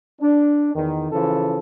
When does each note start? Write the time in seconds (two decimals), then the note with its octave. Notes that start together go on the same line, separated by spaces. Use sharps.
0.21 D4
0.75 E2 D#3
1.10 C#3 E3 F3 A4